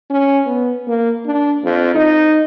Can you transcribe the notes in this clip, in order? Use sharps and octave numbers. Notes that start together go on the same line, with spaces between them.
C#4
B3
A#3
D4
F2
D#4